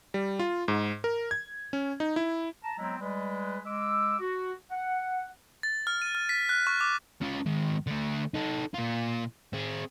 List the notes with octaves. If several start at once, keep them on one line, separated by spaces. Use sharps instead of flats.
G3
F4
G#2
A#4
G#6
C#4
D#4
E4
A5 A#5
F#3 G#3 B3 C4 E4 A#5
G3 G#3 B4
G#3 D6 E6
F#4
F#5
A6
F6
D#7
F6
B6
F#6
C#6
D6
C#4 F4
G#2 D#3
D3 A3
D#4 A4
A#2 F4
C4 G#4